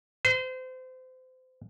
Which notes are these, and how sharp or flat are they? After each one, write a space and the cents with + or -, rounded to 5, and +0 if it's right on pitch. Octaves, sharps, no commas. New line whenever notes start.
C5 -30